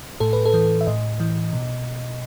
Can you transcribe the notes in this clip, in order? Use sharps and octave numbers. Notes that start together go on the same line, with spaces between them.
A2 A4
B4
A4
E3
E5
A2 D#5
E3
B2